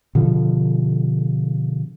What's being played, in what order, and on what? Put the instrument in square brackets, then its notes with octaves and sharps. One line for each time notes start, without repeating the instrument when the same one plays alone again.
[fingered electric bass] B2 D3 F3